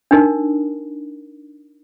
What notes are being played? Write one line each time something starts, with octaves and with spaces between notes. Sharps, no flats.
D4 D#4 A#4